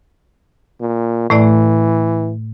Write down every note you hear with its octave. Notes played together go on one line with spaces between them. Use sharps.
A#2
A2 E3 A3 D5